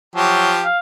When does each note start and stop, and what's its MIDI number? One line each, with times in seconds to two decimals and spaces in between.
0.15 0.64 53
0.15 0.50 54
0.15 0.64 67
0.65 0.78 77